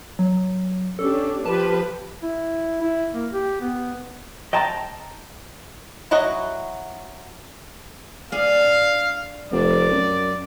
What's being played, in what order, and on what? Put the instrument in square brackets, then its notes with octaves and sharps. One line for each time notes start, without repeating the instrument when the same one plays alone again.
[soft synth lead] F#3
[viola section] C#4 D4 G4 [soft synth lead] A4
[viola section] F3 G4 B4 [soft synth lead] A5
[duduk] E4
E4
A#3
G4
B3
[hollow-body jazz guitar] D#5 G5 A5 A#5
[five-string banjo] F#3 E4 F#4 D#5 F#5
[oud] D4 G#4 [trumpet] F5
[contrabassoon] F1 [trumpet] D5
[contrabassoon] F#2